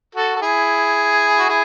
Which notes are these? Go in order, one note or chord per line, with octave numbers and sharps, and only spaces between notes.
F#4 A4
A4
E4 G#4
F#4
E4 G#4